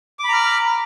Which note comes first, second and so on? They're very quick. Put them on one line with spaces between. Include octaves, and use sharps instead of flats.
D6 B5 A#5 F6